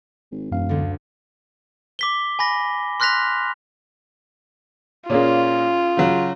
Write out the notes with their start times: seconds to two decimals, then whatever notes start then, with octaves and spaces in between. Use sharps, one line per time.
0.31 G#1
0.52 E1 F#2 F5
0.69 D2 D3
1.99 D6 B6 G7
2.39 G#5 B5 A#6
3.00 C6 F6 F#6 A#6 B6 F7
5.10 A#2 A#3 C#4 F4 G#4 C#5
5.97 C#3 F#3